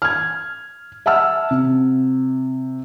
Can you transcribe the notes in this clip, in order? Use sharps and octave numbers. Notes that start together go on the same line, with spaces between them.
F6 G#6
E5 F#5 A5 E6 F6
C3